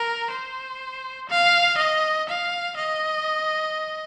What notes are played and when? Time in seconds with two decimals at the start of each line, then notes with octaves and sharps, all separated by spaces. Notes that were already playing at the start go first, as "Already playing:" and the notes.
Already playing: A#4
0.31 C5
1.29 F5
1.78 D#5
2.29 F5
2.77 D#5